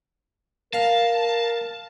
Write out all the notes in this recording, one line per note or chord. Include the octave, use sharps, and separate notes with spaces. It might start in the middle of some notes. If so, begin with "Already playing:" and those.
A#4 F5 A5